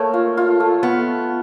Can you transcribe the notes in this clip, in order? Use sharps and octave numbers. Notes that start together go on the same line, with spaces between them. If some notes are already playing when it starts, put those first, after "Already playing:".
Already playing: A3 A#3 A4 C#5
F4
F4
A3
B3